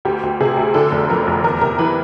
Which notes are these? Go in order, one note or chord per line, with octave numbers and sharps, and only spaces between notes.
D2 G4
D2
C3 G#4
D2
D3 A4
F1
F2 A#4
F1
E2 A#4
C3 A#4
E3 B4